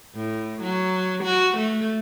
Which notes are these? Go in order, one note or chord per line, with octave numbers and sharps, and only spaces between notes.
A2
F#3
F#4
A3